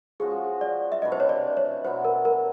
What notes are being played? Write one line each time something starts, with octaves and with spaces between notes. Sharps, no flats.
F3 G#3 C#4 F#4 G#4
D5
E5
C3 E3 A3 D4 D#5
C5
C#5
D5
C#5
B2 F#3 B3 E4 C5
A#4
A#4